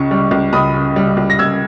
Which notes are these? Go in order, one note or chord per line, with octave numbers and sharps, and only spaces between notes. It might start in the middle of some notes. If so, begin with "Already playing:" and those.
Already playing: C#2 C#3 C#6
G3
C#2
C#2 B5 D#6
C#3
G3
C#2
A#6
C#2 E6 G#6